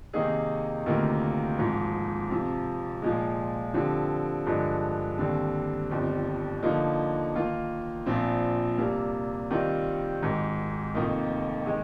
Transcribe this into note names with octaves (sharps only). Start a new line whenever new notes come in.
C3 D#3 A#3 D#4 G#4
D2 C3 D#3 A#3 F4
G#1 G#2 F3
F2 C3 F3
A#2 F3 G#3
D3 F3 C4 G4
G2 D3 F3 G#3
D#2 D3 G3 C4
G1 F2 D#3 G3
D3 F3 A#3 D#4
D#3 A#3 F4
A#1 A#2 F3 C4
C3 G3 A#3
D#3 G3 C4 F4
G#1 G#2 D#3
F1 F2 D#3 A#3 D#4
D#3 G#3